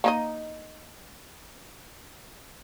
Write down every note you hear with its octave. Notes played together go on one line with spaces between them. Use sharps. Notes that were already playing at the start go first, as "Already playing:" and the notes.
A#3 D#4 D#5